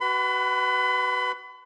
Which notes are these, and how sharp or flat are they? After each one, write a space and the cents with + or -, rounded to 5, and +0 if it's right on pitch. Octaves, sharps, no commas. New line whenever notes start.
F#4 +25 B4 +0 B5 +35